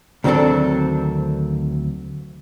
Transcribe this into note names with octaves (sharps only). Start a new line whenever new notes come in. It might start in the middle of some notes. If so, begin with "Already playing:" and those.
D2 D#3 F#3 C4 D4 A4